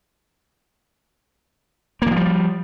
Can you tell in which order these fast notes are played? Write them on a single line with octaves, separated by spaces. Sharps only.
A#3 E3 F3 G3